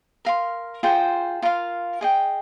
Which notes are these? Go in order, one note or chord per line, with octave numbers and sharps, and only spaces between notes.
A#4 F5 C6
F4 G#4 C5 G5
F4 A#4 F5 C6
G#4 D#5 G5